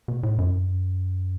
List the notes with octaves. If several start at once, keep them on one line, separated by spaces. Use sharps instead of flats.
B2
A2
F#2